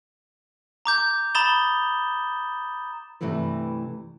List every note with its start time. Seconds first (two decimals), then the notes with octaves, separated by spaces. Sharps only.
0.85 A#5 D6 G6
1.35 A#5 B5 D#6 A6 E7 G7
3.21 G2 C3 E3 A3 E4 B4